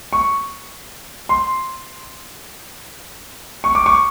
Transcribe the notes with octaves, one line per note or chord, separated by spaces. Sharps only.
C#6
C6
C#6
D6
C#6